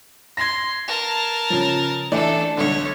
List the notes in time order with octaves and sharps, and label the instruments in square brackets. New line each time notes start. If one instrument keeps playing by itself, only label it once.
[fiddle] C6 [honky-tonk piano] G#6 A#6
[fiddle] A#4 A5
[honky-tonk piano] C#3 F3
[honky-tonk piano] E3 A3 D5 [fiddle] D4 A4
[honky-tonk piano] B1 D3 [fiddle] C#5